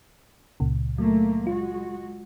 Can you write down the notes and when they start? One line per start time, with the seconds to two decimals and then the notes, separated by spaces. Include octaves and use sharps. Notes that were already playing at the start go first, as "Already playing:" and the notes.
0.60 C#2 A#2 C#3
0.98 F#3 A3 A#3
1.47 G#3 F4 F#4